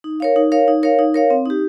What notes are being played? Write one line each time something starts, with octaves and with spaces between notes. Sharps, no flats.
D#4
A#4 C#5 F5
D#4
A#4 C#5 F5
D#4
A#4 C#5 F5
D#4
A#4 C#5 F5
C4
D#4 G4